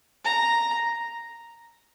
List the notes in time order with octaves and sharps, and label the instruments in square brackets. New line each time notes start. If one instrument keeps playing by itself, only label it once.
[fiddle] A#5